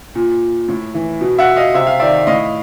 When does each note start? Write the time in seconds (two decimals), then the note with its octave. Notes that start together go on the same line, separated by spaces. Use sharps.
0.15 A#2
0.69 A2
0.94 E3
1.21 B2
1.39 E5 F#5
1.56 D#5 F5
1.74 C3 E5
1.87 F5
2.00 D#3 D5 E5
2.27 A2 D#5 F5